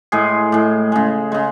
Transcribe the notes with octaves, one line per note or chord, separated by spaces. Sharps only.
A2 G#3 G#4
A2 G#3
C#3 G#3
C#3 G#3